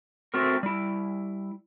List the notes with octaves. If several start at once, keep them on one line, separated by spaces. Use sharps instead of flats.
A3 C4 F#4 A#4
G3 E4